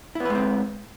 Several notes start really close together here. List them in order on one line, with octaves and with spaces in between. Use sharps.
E4 B3 B4 G#3 C4